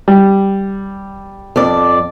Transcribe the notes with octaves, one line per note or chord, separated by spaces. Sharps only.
G3
F2 D5